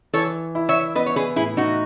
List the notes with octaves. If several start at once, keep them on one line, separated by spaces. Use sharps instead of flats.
E3 A4 C#5
E4
C#5 E5
B3 B4 D#5
C#5
G#4 B4
A2 E4 G#4
D#4 F#4